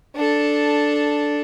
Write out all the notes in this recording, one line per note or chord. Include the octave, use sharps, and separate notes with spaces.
D4 A4